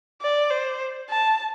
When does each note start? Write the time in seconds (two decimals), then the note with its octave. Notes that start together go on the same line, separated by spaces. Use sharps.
0.22 D5
0.50 C5
1.10 A5